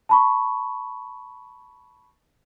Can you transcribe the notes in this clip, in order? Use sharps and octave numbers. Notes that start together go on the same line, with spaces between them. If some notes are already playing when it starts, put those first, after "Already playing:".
A5 B5 C#6